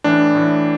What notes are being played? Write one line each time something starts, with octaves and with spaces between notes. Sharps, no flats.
A2 E3 D4
A2 E3